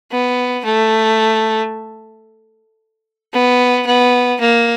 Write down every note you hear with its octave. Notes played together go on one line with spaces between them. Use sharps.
B3
A3
B3
B3
A#3